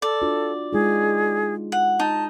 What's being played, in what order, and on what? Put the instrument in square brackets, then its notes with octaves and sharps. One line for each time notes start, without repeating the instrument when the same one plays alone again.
[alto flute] A4 [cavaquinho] D5
[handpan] D4 F4 F#4
[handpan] G#3 D#4 F4 [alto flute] G#4
[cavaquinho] F#5
[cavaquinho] D#4 [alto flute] A5